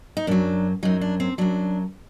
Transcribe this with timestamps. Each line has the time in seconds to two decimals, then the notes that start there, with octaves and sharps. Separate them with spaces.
0.17 D#4
0.27 F#2 F#3 D4
0.83 F#2 F#3 D#4
1.01 D4
1.20 C4
1.38 F#2 F#3 D4